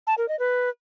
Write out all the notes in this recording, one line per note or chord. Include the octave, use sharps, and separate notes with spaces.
A5
A#4
D#5
B4